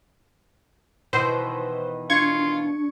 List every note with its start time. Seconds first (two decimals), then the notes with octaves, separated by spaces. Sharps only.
1.13 B2 D#3 E3 C5
2.10 D4 F4 C#6 G#6